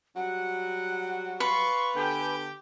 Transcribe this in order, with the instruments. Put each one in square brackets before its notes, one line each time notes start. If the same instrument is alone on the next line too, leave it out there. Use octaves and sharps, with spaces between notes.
[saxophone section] F#3 G3 F#4 [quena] F#5
[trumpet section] F4 C6 C#6 [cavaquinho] B4
[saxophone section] D3 B3 A4 [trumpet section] G4 G5 [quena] G#5